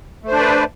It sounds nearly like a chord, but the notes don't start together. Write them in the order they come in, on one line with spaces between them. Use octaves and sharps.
A3 C5 D4 D5 B4